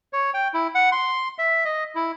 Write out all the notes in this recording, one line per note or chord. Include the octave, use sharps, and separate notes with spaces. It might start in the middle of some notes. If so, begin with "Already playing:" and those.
C#5
G5
E4
F#5
C6
E5
D#5
E4